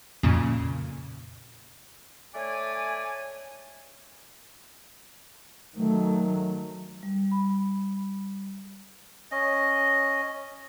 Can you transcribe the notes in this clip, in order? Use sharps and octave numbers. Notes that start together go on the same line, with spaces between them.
F2 A#2 C#3
A3 C#5 D5 G#5
D#3 F#3 A3
G3
B5
C#4 D#5